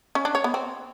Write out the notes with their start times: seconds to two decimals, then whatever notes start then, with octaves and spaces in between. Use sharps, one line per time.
0.15 C#4
0.25 D4
0.35 C#5
0.44 B3
0.54 C4